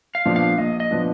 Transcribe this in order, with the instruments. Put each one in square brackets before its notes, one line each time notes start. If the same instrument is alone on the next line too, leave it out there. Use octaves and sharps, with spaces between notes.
[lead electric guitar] F5
[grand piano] A#2 F3 B3 D4
[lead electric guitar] F5
[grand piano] A#1 [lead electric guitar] D#5
[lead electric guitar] D#5
[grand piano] A#2 F3 B3 D4